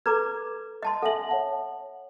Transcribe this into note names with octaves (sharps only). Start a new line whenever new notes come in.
A4 B4 A#5 D6 G#6
D#5 A5 C6
A4 E5 F#5 G#5 F#7
C#5 F#5 A5